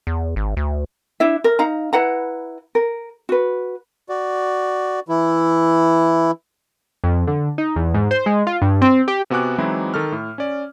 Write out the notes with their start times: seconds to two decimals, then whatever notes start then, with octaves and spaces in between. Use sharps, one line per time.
0.07 E2
0.36 G#1
0.57 D2
1.20 D4 E4 E5
1.44 A#4
1.59 D#4 F5 A#5
1.93 E4 B4 F#5 A#5
2.75 A#4
3.29 F#4 B4
4.09 F#4 D5
5.08 E3 E4
7.04 F2
7.27 D3
7.58 D#4
7.76 E2
7.94 G#2
8.11 C5
8.26 G#3
8.47 F4
8.62 G2
8.82 C4
9.08 G4
9.30 C3 B3 F#4 G#5 D6 F#6
9.58 E3 F#3 G#3 C4 D#4 E4
9.94 D#3 A4 F6
10.12 A2
10.38 C#4 D5